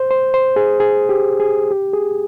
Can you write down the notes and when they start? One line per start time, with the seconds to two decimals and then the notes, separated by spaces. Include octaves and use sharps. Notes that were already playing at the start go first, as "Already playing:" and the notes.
Already playing: C5
0.11 C5
0.34 C5
0.56 G#4
0.80 G#4
1.09 G4
1.40 G#4
1.71 G4
1.93 G#4